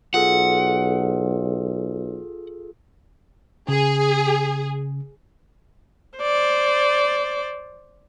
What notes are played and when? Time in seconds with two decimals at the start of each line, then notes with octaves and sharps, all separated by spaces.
0.14 B1 F4 G#4 A4 F#5
3.69 C#3 G#4
6.18 C5 D5